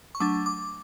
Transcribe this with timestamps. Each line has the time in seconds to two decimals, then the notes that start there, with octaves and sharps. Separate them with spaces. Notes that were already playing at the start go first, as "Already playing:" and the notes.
0.15 C#6
0.20 F#3 A3 D4 D6
0.46 D6